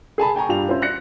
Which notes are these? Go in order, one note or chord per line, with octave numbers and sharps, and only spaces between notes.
G#4 G#5 A5 B5
G5 G#5 A#5 C#6
G2 F4 G4 F7
C4 C#4 E4 F4 C5
F#6 A#6 C#7